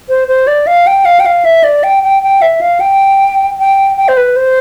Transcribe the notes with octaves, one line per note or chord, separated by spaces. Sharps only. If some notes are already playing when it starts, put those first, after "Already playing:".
C5
C5
D5
F5
G5
F5
G5
F5
E5
D5
G5
G5
G5
E5
F5
G5
G5
G5
C5
B4
C5